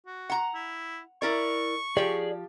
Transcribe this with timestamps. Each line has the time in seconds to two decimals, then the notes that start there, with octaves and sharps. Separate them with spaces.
0.06 F#4
0.30 F#5 A#5
0.54 E4
1.22 E4 A#4 D5 C#6
1.97 F3 G4 G#4 D5